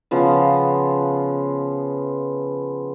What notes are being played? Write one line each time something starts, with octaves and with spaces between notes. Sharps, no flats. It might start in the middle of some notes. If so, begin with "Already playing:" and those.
C#3 F3 B3